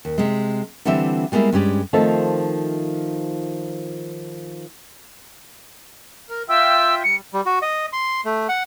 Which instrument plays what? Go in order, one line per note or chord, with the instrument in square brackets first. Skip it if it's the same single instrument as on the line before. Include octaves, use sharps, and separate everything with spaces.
[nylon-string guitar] D#2
C3 G#3
D3 E3 G3 C4 G4 E5
G3 G#3 A#3 B3 E4
G2 G#3 C#4 G4 D5
D#3 F3 A3 C4 F4 A4
[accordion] A#4
[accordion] F4 E5 G5 [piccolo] E6
[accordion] G3 [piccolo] C#7
[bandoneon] G3
F#4
D#5
C6
A3
F#5